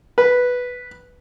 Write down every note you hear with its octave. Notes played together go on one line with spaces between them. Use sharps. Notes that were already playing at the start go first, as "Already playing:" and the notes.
B4